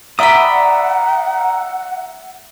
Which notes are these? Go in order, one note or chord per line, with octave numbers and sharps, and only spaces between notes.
D5 E5 F#5 G5 A#5 B5 D#6